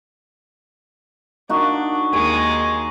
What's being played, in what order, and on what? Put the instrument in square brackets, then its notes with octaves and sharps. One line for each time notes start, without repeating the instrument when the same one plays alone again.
[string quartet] D4 [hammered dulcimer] D#4 F#4
[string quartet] D#2 G#3 [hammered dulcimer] C#5